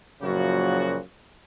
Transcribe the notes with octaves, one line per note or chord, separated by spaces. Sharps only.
F#1 F#2 A#2 C#3 F3 F#4